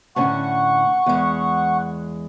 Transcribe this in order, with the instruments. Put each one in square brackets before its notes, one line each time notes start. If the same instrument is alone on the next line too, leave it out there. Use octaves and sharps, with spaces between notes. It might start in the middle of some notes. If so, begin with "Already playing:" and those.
[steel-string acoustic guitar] A2 D3 C#4 [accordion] F#5 C#6
[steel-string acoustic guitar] E2 G#3